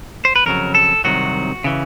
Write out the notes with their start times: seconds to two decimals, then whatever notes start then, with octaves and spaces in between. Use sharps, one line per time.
0.25 C5
0.36 B4
0.46 F2 C#3 F#3 A#4
0.75 A4
1.04 C2 C3 D#3 F#3 F#4
1.64 C#3 E3